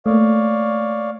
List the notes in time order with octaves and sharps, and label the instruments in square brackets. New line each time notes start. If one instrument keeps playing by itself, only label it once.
[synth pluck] A3 A#3 [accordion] C#5 D5 F5